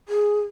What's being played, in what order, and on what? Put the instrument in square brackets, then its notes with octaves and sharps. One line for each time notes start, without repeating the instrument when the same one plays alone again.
[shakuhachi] G#4